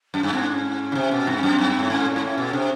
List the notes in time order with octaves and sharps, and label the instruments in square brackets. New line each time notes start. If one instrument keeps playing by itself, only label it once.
[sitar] F#2
G2
[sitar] G#2 [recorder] C4
[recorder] D4
C#4
[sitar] C#3
C3
B2
[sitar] G2 [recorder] C4
[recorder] C#4
[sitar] F#2
[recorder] C4
[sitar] G2
A2
[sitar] G#2 [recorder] C#4
[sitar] A#2
G#2
A2
B2
[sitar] C3 [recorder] D4